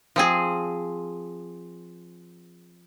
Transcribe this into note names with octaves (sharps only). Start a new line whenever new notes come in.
F3 C4 G#4